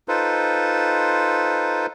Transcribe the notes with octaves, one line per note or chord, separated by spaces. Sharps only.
D#4 F4 A4 B4 C5